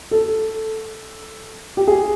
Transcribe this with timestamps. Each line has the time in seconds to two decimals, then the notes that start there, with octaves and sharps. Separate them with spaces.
0.11 A4
1.77 G4
1.88 G#4